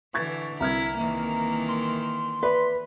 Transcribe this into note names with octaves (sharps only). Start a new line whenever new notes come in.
D3 E3 C#6 G#6 A6
C2 E4 A#5 F6 G#6
D#3 E3 A#3
C6
B4 D5 E5 B5